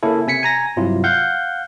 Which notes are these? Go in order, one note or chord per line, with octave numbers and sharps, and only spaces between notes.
C#3 A#3 C#4 E4 A4
C3 G#5 B6 C#7
G#5 A#5 A#6
G2 C3 F#3 E4 F4
F5 F#5 G6